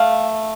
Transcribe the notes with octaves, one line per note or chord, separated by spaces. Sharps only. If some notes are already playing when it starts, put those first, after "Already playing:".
Already playing: A3 F5